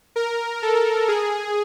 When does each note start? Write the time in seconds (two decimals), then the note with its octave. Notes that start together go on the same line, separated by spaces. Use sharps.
0.16 A#4
0.62 A4
1.08 G#4